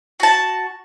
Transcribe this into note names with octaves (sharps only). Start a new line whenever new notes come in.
F#4 A5